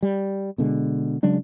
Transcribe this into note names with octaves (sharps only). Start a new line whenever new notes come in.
G3
B2 D3 G#3
C#3 F#3 G#3 D4